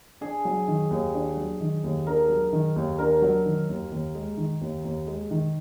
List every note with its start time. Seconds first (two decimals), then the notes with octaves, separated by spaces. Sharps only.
0.21 D4 G#4
0.45 F#3
0.68 D#3
0.91 D#2
1.15 D4
1.37 F#3
1.61 D#3
1.84 D#2
2.07 D4 A#4
2.30 F#3
2.53 D#3
2.76 D#2
2.99 D4 A#4
3.22 F#3
3.46 D#3
3.69 D#2
3.92 D#2
4.15 G#3
4.37 D#3
4.61 D#2
4.84 D#2
5.07 G#3
5.31 D#3